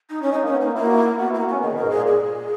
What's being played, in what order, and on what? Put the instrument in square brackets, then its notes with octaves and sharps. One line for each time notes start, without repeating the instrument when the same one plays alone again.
[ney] D#4
C#4
[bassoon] G#3 [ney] D#4
[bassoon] A#3
[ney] C#4
[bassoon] B3
[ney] A#3 [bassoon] D#4
[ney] A#3 [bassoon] E4
[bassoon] F#4
E4
[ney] B3 [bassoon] F#4
[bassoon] E4
[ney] A#3
[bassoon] F#4
[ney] B3 [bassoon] C#4
[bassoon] D#3 [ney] G#4
[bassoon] B2
[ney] A#4
[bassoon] G#2
[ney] G#4
[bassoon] A#2
[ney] G#4